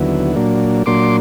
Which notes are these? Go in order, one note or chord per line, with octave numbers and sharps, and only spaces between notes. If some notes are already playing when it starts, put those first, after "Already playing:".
Already playing: D#2 D3 F#3 B3 E4
A#2 F#3 A#3 D4
A#2 F#3 A#3 D4 C6 D6